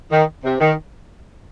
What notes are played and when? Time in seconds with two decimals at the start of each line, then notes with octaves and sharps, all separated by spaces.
0.11 D#3
0.44 C3
0.61 D#3